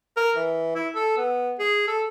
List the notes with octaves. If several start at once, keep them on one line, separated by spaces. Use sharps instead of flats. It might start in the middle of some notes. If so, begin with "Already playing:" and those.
A#4
E3
E4
A4
B3
G#4
A4